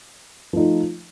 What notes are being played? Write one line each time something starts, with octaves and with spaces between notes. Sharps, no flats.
F3 A3 D#4